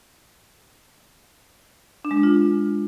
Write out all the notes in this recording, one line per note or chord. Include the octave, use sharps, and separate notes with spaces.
D4
G#3
D4
F4